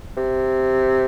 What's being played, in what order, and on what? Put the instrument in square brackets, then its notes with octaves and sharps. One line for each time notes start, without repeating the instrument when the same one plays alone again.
[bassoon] C3